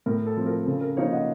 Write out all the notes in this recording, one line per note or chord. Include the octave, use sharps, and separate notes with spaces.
A2 A#4
A4
F3 C4
A#4
C#3 A4
A#4
F3 A#3 D#4 C#5 F5
D#5 F#5